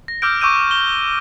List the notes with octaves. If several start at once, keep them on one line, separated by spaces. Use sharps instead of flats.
A#6
D6 E6 F6 G6 D7
C#6 D6 E6 G6 D#7
G7